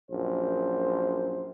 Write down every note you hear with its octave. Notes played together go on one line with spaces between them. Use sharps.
A#1 F#2 C5